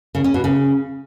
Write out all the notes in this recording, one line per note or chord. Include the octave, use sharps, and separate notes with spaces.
C#3
C#4
B2
C#3